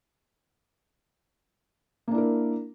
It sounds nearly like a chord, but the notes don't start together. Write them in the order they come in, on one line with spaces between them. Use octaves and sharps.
A#3 D4 E4 A#4